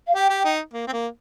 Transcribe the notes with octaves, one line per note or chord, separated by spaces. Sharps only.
F5
G4 G5
G4
D#4
A#3
C4
A#3